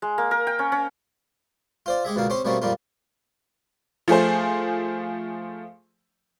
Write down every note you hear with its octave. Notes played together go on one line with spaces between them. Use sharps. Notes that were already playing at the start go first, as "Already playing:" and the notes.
G#3
A#3
A#4
G5
C#4
C#4
F4 C5 D5
G#3 G4 G#4 E5
C#2 B2 D3 A#3 F5
C4 C#4 G4 C5
B2 G3 A3 A#3 C4 C#4
F2 A#2 G3 A#3 F4
F3 A3 G#4 C5